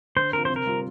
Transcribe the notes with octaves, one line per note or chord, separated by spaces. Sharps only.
D3 C5
F3 C4 A#4
C3 C5
A#4
G3 C4 F4